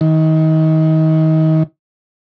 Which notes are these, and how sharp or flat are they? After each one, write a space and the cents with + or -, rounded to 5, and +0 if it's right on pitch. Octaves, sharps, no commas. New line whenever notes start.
D#3 +30